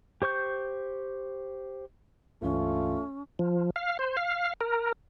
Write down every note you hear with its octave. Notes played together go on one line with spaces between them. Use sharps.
G4 C5 C#6 G6
C#2 G2 E3 A3 C#4 F4
F3
F5
C5
F5
A#4